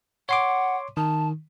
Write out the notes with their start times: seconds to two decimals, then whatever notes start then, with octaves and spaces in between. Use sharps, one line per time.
0.29 C#5 F#5 C6 D6
0.97 D#3 A5